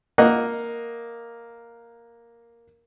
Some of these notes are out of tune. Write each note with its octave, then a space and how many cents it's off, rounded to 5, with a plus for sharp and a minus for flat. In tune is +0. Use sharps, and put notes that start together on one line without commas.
A#3 +0 D#5 +0 F#5 +0